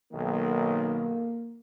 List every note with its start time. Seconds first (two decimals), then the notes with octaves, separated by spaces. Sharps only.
0.12 B1 D#3 A#3